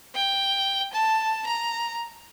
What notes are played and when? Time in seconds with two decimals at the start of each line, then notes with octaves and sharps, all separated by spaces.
0.15 G5
0.93 A5
1.46 A#5